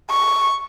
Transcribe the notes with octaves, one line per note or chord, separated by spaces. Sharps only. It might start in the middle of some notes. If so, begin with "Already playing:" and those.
C#6